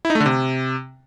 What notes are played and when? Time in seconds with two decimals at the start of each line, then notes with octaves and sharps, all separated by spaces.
0.05 E4
0.10 D#4
0.15 A3
0.20 D3
0.26 C3